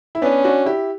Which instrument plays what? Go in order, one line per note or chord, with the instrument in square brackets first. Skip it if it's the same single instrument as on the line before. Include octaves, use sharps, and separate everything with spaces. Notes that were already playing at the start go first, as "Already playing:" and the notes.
[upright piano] E4
[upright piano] B3 D4 [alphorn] C#4
[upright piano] D4 F#4
E4 G4